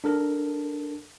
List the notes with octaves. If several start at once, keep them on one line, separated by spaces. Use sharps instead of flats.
D4 A4 A#4